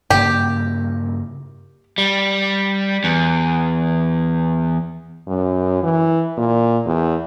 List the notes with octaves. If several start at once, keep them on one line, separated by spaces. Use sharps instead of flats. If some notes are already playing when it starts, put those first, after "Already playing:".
G2 C#3 A#3 G4
G3
E2
F#2
E3
A#2
E2